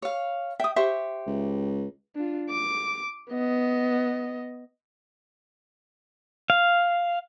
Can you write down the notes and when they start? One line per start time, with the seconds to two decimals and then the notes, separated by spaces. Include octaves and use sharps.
0.02 C#5 F5
0.60 E5 G5 D#6
0.76 G4 C5 E5 C#6
1.26 C#2
2.16 D4 F4
2.49 D6
3.30 B3 D#5
6.50 F5